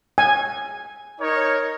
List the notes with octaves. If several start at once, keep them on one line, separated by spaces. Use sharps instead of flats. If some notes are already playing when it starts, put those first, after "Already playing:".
G#5
D#4 A#4 C#5